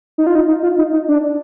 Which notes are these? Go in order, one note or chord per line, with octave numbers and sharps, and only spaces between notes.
D#4
F4
D#4
D#4
F4
D#4
D#4
D4